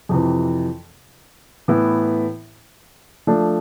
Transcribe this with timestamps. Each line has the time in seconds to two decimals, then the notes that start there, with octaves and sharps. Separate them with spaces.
0.09 F2 C3 E3
1.68 A2 E3 B3 E4
3.27 F3 A3 D4